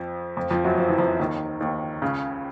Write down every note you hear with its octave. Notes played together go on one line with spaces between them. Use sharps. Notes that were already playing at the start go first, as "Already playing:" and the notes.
Already playing: F2 F3
F2 F3
F2 F3
F#2 F#3
F3
E3
F2 F3
D#2 D#3
D#2 D#3
C#2 C#3